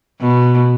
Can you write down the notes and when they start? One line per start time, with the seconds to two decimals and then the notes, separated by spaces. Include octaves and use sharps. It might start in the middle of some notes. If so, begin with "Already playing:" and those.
0.21 B2